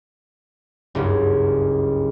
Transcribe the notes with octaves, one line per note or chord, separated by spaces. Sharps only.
F#1 C#2 G2 C#4